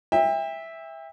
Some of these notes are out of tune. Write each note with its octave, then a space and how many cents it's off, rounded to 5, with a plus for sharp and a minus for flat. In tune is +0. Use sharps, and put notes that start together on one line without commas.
E5 -5 G5 +35